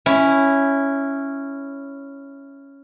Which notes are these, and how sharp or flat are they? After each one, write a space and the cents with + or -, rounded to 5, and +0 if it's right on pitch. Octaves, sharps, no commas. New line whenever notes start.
C#4 +0 E4 +0